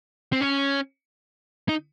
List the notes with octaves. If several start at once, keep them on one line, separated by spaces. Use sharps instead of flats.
C4
C#4
D#4